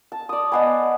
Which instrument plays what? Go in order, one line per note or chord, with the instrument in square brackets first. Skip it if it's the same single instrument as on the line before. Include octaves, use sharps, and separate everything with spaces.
[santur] A5
D5 D#6
[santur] B3 [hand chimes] D#5 F#5 G#5